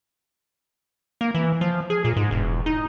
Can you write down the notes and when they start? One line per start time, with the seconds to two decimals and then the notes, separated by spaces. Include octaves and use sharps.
1.21 A#3
1.35 E3
1.61 F3
1.90 G#4
2.04 A#2
2.16 G#2
2.31 E1
2.66 D#4